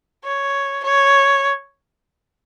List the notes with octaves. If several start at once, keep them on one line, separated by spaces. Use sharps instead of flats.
C#5
C#5